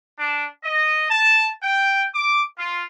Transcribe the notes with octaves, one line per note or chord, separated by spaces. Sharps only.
D4
D#5
A5
G5
D6
F4